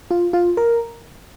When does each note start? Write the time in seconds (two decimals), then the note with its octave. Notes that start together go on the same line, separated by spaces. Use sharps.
0.11 F4
0.33 F4
0.57 A#4